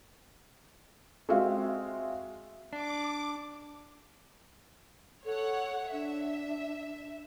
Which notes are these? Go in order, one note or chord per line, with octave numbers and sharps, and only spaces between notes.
G#3 C4 F#4 E5 F5
D4 D6
A4 C#5 F#5
D4 E5